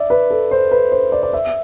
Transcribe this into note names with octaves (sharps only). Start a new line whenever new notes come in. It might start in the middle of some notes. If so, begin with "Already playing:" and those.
Already playing: D5 E5
B4
A4
C5
B4
C5
D5
D5
E5